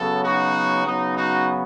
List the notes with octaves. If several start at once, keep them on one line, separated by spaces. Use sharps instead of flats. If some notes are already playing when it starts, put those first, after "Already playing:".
Already playing: C#3 F#3 B3 A4
D#4 F#4
C#3 F#3 B3 D#4
D#4 F#4